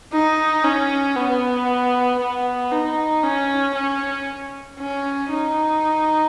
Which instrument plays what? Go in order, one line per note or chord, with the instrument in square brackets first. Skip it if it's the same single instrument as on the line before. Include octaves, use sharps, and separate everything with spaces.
[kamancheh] D#4
C#4
B3
B3
D#4
C#4
C#4
C#4
D#4